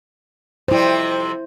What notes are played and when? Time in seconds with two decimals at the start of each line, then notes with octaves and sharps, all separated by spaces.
0.68 F2 C3 G3 E4 C5